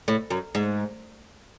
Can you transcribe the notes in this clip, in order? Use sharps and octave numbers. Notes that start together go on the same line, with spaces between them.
A2
F#2
G#2